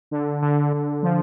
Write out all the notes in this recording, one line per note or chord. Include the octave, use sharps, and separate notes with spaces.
D3
D3
D3
F3